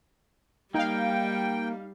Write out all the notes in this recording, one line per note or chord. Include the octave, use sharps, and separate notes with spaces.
G3 A#3 D#4 F5 G5